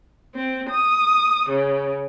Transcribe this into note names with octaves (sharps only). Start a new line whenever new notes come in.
C4
D#6
C#3